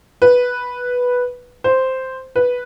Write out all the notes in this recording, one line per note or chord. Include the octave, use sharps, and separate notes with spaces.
B4
C5
B4